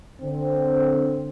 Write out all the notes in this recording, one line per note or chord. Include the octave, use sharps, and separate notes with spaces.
D3 C4